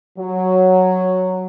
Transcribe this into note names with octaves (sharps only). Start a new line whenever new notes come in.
F#3